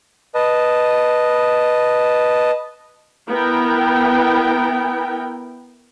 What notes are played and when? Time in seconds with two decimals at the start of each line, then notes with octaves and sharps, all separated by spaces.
0.35 B4 D#5 A5
3.29 B3 E4 A#4 G5